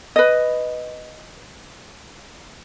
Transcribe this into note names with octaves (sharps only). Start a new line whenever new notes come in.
B4 D#5